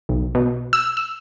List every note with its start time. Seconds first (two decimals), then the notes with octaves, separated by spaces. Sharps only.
0.09 B1
0.35 B2
0.73 E6
0.97 E6